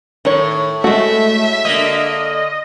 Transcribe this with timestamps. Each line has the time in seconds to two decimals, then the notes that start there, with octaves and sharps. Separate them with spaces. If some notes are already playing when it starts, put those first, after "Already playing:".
0.25 A2 D#3 C#5
0.84 G#3 A3 F#4 E5
1.65 D3 A#3 D#5